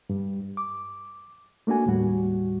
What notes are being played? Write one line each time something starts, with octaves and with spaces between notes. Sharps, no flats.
G2
D6
A3 A#3 D4 F#4 G#5
D#2 A2 G3 F#4